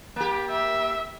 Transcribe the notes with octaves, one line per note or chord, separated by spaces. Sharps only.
A#3 G4
E5